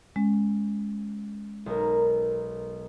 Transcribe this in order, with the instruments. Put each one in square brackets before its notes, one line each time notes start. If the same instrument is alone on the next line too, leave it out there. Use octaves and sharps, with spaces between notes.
[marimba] G#3 C#4
[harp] B1 A#4